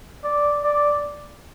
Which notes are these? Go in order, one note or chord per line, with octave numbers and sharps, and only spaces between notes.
D5
D5